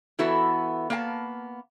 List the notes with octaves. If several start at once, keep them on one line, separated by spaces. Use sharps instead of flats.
E3 B3 E4 F#4 A4 E5
A#3 B3 F5 G5 A5